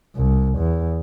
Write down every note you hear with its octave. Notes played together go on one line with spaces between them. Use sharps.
C2
E2